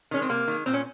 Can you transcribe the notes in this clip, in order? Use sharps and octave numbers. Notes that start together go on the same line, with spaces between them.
D#3 G#3 C#4
C4
C3 A#3
D#3 G#3
A#2 C4
C#4